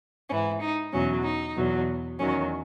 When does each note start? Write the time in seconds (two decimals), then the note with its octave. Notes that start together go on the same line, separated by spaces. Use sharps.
0.29 G#2 E3 C#4
0.61 D#4
0.93 E2 B2 F#3 C#4
1.24 D#4
1.56 E2 B2 F#3
2.19 E2 D#3 F#3 C#4